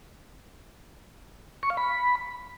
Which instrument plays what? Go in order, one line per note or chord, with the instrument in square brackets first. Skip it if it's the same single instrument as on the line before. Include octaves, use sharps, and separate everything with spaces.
[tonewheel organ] C#6
F5
B5